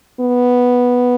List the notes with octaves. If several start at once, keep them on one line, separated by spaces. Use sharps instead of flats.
B3